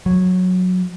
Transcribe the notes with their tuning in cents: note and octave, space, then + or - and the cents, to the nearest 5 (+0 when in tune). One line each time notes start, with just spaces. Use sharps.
F#3 -15